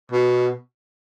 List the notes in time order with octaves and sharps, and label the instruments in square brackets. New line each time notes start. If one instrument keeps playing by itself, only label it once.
[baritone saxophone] B2